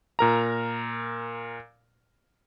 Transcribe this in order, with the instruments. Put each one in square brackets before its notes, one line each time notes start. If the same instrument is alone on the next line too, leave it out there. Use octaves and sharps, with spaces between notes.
[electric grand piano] A#2 A#4 A#5